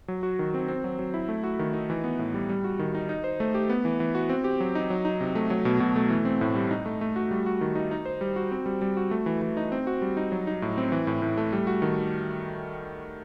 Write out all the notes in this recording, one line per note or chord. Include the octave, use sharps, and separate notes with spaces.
F#3
F#4
D#3
C4
C4
F#3
F#3
E4
A3
F#4
D#3
D#4
E3
B3
A2
G3
G3
F#4
D#3
D#4
D#4
C5
A3
G4
B3
E3
E3
F#4
C4
G4
F#3
D#4
F#3
D#4
C3
A3
F#3
B2
B2
A3
E3
C4
A2
G3
D#4
A3
A3
F#4
G3
F#4
D#3
D#4
D#4
C5
G3
F#4
C4
G3
G3
F#4
A3
E3
E3
D#4
C4
F#4
G3
D#4
F#3
D#4
A2
C4
E3
A2
A2
A3
G3
F#4
D#3